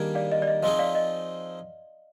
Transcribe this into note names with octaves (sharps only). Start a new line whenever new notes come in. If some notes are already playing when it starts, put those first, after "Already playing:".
Already playing: D#3 G3 A#3 D4 G#4 G#6
D5 F5
D#5
D5
D#5
F3 C4 D#4 G#4 D#5
D5 F5
D#5